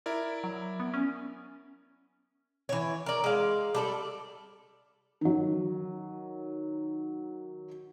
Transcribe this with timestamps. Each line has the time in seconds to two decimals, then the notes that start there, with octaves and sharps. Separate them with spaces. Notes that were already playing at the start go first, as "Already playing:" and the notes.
0.06 E4 A#4 D5
0.44 F#3
0.80 B3
0.94 C#4
2.69 E3 C#5
3.06 A#4 D5
3.24 G#3 F5
3.75 G3 A4 D5
5.21 D#3 F#3